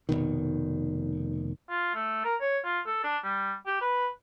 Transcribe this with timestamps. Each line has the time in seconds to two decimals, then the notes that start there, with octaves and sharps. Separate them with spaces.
0.09 F1 C2 B2 D#3
1.69 F4
1.94 A3
2.24 A#4
2.41 C#5
2.64 F4
2.86 A4
3.04 D4
3.23 G3
3.66 G4
3.81 B4